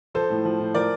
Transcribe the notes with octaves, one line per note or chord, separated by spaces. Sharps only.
F3 A4 C5
A2
F3
A2
F3 A#4 D5